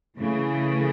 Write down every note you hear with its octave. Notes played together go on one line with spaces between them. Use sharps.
C#3 E3 A3